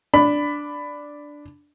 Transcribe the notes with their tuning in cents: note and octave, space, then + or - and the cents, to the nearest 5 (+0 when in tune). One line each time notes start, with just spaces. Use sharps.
D4 +0 B5 +15